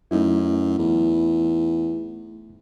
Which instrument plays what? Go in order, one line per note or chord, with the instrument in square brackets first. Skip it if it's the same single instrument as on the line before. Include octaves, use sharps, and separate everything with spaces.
[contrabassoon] F#2 [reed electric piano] A3 D#4 E4
[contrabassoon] E2